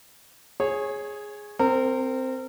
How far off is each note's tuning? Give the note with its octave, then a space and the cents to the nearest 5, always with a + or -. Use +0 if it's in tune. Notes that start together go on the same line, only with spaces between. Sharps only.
G#4 +0 C#5 -20
C4 -5 A#4 -30